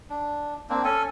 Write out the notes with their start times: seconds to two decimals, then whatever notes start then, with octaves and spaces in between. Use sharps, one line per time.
0.10 D4
0.69 A#3 C4 D4
0.84 C#4 A4 G#5